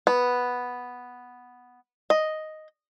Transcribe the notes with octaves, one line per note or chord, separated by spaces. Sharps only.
B3
D#5